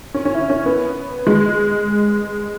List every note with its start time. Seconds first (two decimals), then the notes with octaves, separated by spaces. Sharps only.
0.14 C#4
0.25 C#4
0.35 E4
0.50 C#4
0.66 B3
1.27 G#3